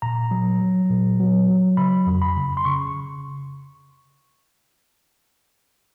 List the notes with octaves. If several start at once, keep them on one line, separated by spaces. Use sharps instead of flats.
A#2 A#5
F#3
F#3
A#2
F#3
F#3
C#3 B5
F2
B5
C#3
C6
C#3 C#6